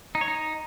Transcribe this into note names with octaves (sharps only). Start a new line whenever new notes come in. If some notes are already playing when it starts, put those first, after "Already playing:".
D#4
C#5
D#4